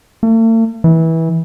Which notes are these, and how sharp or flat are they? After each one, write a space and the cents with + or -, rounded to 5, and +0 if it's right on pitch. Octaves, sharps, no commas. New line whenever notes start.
A3 +45
E3 -20